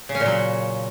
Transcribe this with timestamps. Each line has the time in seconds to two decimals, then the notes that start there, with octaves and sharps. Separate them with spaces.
0.09 C#3
0.15 C#4
0.20 A#2
0.26 F#3